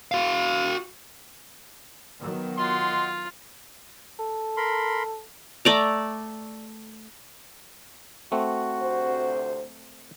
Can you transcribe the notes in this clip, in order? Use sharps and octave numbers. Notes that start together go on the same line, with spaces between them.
F#4 F5
D#3 F#3 B3
F4 D#5 F#5 C6
A4
A#4 B5 C6
A3 D5 A#5
A3 C4 F#4
D2 C3 C5